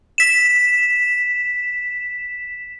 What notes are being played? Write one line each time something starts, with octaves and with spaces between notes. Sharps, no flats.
B6 E7